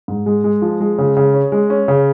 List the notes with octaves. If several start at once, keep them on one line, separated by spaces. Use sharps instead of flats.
G#2
G#3
G#3
F3
G#3
C#3
C#3
C#4
G#3
C#4
C#3